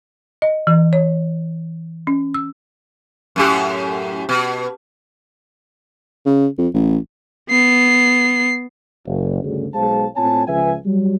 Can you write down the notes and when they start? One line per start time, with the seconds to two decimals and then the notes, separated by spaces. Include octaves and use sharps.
0.42 D#5
0.67 E3
0.93 C#5
2.07 C#4
2.34 E6
3.36 F#2 A2 G4
4.29 B2
6.26 C#3
6.58 F2
6.74 A1
7.50 B3 C7
9.06 F#1
9.43 D2 G2 C#3
9.74 B1 G#3 C5 F5 A5
10.16 A2 C4 F4 C#5 G#5 A5
10.48 C#2 C#3 F3 B4 E5 G#5
10.85 F#3 G3